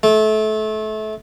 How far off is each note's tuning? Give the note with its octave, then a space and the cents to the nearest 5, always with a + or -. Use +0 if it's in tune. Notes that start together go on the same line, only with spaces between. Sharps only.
A3 -25